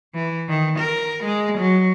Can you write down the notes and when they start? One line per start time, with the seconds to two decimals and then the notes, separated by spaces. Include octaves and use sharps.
0.15 E3
0.49 D#3
0.79 A#4
1.24 G#3
1.59 F#3